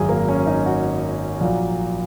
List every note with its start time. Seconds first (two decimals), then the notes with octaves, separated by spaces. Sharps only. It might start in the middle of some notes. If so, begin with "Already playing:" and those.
Already playing: G#1 F#2 F#3 G#4
0.09 A#3
0.29 C#4
0.47 D#4
0.66 F#4
1.41 A#1 A#2 F#3